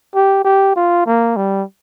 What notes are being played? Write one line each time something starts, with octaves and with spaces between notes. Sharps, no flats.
G4
G4
F4
A#3
G3